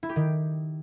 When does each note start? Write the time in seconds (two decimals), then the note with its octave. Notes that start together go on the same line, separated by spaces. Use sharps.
0.03 E4
0.09 G4
0.16 D#3